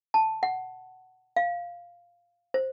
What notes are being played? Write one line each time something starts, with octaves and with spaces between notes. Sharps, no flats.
A5
F#5
F5
C5